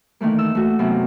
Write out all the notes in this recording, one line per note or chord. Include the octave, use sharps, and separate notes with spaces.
D#3 E3 A3 A#3
E6
A3 F#4
F#2 C3 B3